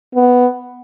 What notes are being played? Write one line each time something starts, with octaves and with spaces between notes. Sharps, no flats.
B3